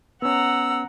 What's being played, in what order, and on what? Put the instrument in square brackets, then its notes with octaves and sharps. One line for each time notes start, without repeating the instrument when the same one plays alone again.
[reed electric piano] B3 C#4 [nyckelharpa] F#5 A#5 [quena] E6